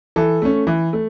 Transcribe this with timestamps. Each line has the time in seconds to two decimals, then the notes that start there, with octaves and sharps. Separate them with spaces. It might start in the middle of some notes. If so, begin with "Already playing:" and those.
0.16 E3 A4
0.42 A3 C#4
0.67 E3
0.93 A3